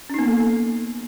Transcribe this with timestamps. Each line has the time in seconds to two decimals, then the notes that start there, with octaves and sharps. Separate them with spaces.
0.10 C#4
0.14 D#4
0.19 B3
0.23 A#3
0.28 A4